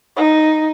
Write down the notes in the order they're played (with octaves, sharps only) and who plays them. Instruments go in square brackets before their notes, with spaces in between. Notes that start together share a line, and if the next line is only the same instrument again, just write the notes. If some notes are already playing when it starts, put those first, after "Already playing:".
[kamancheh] D#4